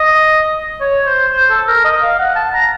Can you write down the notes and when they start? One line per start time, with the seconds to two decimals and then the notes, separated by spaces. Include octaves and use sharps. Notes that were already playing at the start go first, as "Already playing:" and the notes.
Already playing: D#5
0.81 C#5
1.06 C5
1.33 C5
1.50 A4
1.68 A#4
1.85 D#5
2.02 F5
2.19 F#5
2.36 A5
2.54 A#5